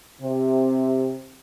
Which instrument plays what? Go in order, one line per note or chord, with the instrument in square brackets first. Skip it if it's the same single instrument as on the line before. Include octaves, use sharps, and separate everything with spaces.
[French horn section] C3